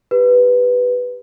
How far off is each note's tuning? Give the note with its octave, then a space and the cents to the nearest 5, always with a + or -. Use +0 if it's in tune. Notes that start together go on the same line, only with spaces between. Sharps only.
G4 +0 B4 +0